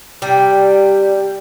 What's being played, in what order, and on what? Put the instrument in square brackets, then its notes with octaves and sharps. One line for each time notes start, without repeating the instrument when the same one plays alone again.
[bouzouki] C3 G3